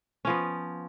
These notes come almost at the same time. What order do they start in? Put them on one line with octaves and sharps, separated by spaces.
C#4 F3 B3